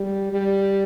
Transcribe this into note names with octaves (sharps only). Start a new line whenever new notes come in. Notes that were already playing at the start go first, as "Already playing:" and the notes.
Already playing: G3
G3